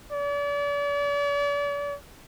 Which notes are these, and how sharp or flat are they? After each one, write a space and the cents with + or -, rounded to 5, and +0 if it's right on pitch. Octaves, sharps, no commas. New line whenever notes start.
D5 -40